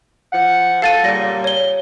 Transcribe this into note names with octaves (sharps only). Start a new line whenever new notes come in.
F3 F#5
A4 F5 A6 D#7
A#2 C#3 G3 A#6
C#5 G7